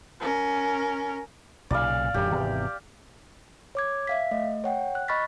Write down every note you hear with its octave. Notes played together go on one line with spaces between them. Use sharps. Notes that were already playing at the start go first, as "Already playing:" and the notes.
C#4 A#4
B1 A#2 C#3 D5 F5
D1 F#2 G4
G#1 E2 C3
C#5 D6 G#6
E5 F5 B6
A3 D#5
C#5 F#5 G5
F#6
D#5 B5 C#6 F6 A6 B6